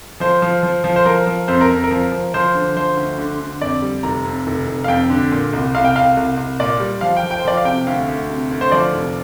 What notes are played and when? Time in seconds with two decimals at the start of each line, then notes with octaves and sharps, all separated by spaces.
0.20 F3 C5
0.42 F3
0.63 F3
0.84 F3
0.96 C5
1.05 F3 A#4
1.27 F3
1.48 F2 C5
1.61 A#4
1.70 F2
1.84 A#4
1.91 F3
2.12 F3
2.34 F3 C5
2.55 D3
2.76 F3 C5
2.97 D2
3.18 D3
3.40 D3
3.61 F2 D5
3.82 G3
4.03 F1 A#5
4.25 F2
4.47 F1
4.67 F1
4.84 F5
4.88 F2 G5
5.10 D3
5.32 A#2
5.53 C2
5.75 C2 F5
5.85 G5
5.95 C2 F5
6.17 C2
6.37 C2
6.60 A#2 D5
6.80 G3
7.01 F3 F5
7.17 G5
7.23 F3
7.31 G5
7.39 C5
7.45 F3 D5
7.57 F5
7.65 C3 G5
7.87 D2 F5
8.08 D2
8.30 C3
8.51 D2
8.61 C5
8.72 F3 D5
8.93 F1